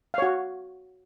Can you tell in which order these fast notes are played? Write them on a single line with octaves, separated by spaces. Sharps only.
F5 C#5 F#4